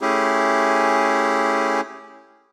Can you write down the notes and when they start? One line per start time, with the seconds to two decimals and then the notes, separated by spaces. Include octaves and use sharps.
0.01 A3 C#4 E4 G4 G#4